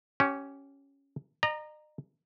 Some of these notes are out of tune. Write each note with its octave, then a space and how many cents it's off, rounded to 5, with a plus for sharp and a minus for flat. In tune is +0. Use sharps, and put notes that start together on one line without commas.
C#4 +0 G4 -25
D#5 -40 A#5 +0